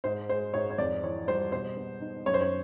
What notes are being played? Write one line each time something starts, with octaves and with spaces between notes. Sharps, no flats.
G#2 C5
G#3 C5
G#2 C#5
C#5
F2 D5
E3 C#5
G3 C5
B2 C5
B3
D#4
F#2 C#5
C5
C#5